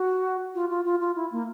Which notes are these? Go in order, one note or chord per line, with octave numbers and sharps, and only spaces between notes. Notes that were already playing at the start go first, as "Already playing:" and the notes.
Already playing: F#4
F4
F4
F4
F4
E4
A#3